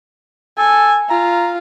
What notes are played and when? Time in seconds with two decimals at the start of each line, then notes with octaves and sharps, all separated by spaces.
0.58 A4 G#5
1.10 F4 A#5